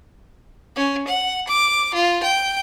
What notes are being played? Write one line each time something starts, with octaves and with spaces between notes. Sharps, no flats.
C#4
F#5
D6
F4
G5